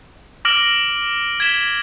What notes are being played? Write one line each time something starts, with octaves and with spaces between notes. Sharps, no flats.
D6 F6 A#6 D7 F#7
G#6 B6 E7 G7